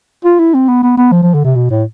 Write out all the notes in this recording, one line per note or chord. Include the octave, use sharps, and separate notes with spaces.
F4
E4
C4
B3
B3
B3
F3
F3
D3
C3
B2
A2